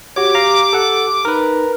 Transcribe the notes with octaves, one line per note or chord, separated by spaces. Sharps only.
F#4 G4 C#5 D6
F5 A#5
A4 F#5
D#4 A#4 B4